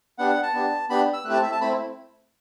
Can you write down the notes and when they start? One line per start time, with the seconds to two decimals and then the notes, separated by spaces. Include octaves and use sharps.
0.18 B3 D4 G4 F#5
0.30 F#5
0.43 A5
0.54 B3 D4 G4
0.89 B3 D4 G4 B5
1.14 E6
1.25 A3 C4 E4 G4 F#6
1.33 A5
1.43 E5
1.52 A5
1.60 A3 C4 E4 B5